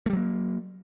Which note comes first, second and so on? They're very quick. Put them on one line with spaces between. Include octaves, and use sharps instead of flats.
A3 G3 F#3 A#3